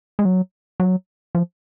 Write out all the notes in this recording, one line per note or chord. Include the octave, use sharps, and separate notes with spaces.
G#3
F#3
F#3
F3